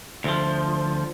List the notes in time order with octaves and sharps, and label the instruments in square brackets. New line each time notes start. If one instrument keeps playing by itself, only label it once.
[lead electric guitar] D2 F3